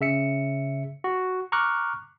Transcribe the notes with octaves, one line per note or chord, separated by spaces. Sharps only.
C#3 E5 C#7
F#4
A#5 C#6 D6 F6 F#6